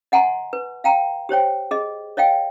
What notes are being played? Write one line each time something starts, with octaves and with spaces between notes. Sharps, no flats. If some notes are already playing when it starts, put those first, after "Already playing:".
D#5 F#5 G#5 A#5 C6
B4
F5 G5 A#5
G4 C5 C#5 G5
G#4 D#5
C#5 D#5 F5 G5